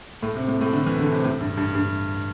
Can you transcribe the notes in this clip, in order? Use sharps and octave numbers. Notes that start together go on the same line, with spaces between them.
A2
C3
A2
A2
D3
E3
D3
C3
A2
G2
G2
G2